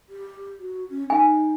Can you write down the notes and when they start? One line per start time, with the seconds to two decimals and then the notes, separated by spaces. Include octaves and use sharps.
0.09 G4
0.59 F#4
0.90 C#4
1.10 D#4 G#5